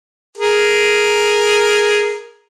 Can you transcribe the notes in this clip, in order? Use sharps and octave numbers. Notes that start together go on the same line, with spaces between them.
G#4 A#4